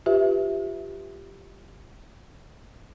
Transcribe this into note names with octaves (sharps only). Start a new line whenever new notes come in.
F4 G4 B4 E5